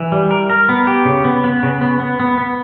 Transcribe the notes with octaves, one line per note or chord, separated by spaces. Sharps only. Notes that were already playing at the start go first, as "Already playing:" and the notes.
Already playing: E3
G3
A#4
A#4
B3
G4
C#3
B3
B3
C#3
B3
B3
B3
B3